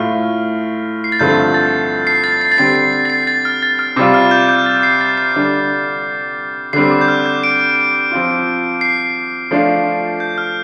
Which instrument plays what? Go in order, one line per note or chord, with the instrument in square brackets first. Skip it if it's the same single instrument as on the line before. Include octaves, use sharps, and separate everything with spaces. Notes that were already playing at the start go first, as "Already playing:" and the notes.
Already playing: [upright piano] A2 A3 F4 [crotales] F6
[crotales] C7
A6
[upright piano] G2 D3 F3 A3 C4 [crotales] G6
[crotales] A6
C7
A6
C7
A6
[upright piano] D3 G3 C4 G4 [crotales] C7
[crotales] C7
C7
A6
C7
A6
F6
A6
F6
[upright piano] C3 G3 F4 [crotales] D6
[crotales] F6
G6
G6
A6
C7
A6
C7
[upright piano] D3 G3 D4
[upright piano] D3 G3 C4 [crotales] C7
[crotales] D6
G6
F6
G6
D7
[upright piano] F3 C4 F4
[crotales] C7
[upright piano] F3 A3 D4 F4
[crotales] G6
F6